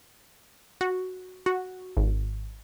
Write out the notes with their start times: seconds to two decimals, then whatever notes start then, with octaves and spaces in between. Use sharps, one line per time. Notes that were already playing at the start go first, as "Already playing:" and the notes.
0.81 F#4
1.46 F#4
1.97 G#1